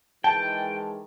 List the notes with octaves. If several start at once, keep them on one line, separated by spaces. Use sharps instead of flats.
D#3 E3 G#3 G5 A5